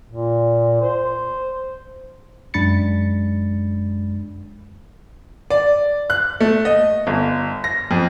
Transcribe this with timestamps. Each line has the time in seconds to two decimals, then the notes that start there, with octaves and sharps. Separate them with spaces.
0.09 A#2
0.82 C5
2.54 F#2 G#3 D4 B5 A6 C#7
5.50 D5
6.10 F#6
6.41 A3
6.65 D#5
7.07 G1
7.64 A#6
7.91 F2